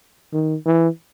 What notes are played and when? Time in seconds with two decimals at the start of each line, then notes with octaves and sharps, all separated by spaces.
0.33 D#3
0.66 E3